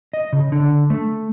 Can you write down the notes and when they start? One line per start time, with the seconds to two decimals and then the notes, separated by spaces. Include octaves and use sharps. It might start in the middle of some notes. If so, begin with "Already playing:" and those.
0.13 D#5
0.33 C#3
0.52 D3
0.90 A3